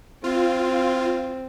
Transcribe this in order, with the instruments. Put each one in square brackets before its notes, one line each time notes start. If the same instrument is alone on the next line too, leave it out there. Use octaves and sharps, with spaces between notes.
[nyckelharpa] C4 [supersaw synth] F4